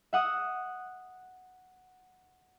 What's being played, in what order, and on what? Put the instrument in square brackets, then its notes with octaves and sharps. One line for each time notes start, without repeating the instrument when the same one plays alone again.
[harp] E5 F#5 D#6